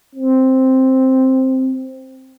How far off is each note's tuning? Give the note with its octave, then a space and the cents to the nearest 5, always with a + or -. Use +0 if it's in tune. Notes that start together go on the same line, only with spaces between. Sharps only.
C4 +0